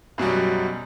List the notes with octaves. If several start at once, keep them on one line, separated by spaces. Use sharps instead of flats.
F#2 B2 F#3 G3